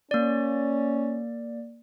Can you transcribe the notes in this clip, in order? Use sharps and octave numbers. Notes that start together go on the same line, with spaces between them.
A#3 C#4 D5